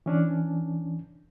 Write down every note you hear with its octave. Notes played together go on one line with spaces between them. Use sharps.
E3 C#4 D4